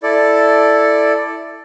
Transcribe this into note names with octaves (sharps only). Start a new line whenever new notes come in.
E4 A4 D5